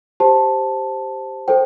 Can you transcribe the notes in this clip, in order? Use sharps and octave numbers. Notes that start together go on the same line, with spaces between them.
G4 C5 A5
A4 C5 G5